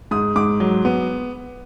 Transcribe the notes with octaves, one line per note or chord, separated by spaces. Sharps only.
G#2 D#6
G#2 D6
F#3
B3